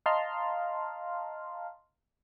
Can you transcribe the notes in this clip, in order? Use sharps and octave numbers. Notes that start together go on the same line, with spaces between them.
D#5 F5 A5 A#5 C6 F6